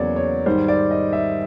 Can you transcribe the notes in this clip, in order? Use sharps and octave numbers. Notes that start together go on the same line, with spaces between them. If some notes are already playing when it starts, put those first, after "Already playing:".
Already playing: E2 C#3 F#3 A#3 C#5 D5
C#5
G#2 D#3 G3 C5
D5
D#5
E5